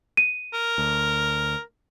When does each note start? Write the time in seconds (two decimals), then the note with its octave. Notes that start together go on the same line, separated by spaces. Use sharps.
0.17 D#7
0.54 A#4
0.78 D2